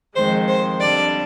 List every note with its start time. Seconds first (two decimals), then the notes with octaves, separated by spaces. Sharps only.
0.15 F2 D#3 G#3 C5
0.48 C5
0.79 F2 D3 G3 D4 D5